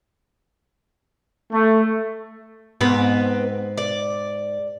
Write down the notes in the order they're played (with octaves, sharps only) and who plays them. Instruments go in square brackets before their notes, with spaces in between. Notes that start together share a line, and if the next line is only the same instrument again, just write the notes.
[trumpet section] A3
[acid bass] G#2 [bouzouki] B3 C4 B4
[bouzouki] D5